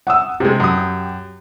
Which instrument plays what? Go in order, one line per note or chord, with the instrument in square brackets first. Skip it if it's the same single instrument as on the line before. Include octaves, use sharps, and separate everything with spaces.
[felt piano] F#5 D#6 E6
[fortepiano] C3 G#3 [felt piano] G4
[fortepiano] F#2 D#6